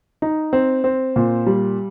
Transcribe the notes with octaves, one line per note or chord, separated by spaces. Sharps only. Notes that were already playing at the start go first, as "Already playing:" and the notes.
D#4
C4
C4
A#2
G3